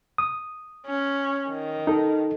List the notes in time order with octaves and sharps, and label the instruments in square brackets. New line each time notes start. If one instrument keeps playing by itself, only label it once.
[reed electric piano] D#6
[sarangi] C#4
D#3
[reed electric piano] D#4 A4